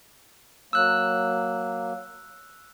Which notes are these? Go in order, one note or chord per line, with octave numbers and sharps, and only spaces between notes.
F#3 A#3 E6 F#6